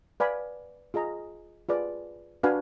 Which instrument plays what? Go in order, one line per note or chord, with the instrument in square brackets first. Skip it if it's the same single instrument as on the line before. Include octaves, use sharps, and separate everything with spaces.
[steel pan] B4 D5 F5 G#5 B5
F4 G#4 D#5 A#5
F4 G#4 B4 D5
D4 F#4 B4 F5 G#5